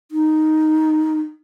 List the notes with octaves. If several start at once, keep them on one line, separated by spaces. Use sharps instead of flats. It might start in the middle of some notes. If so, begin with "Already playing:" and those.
D#4